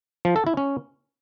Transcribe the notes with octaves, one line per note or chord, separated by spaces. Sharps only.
F3
A4
E4
C#4